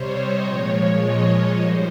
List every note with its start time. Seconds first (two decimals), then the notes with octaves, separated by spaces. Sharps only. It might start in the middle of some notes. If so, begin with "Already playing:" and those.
Already playing: C3 G3 C5 C#5
0.12 D#5
0.40 A#2 F3 G#3 C#5
0.68 C#5
0.97 D#5
1.26 D#5
1.54 G#2 G3 C5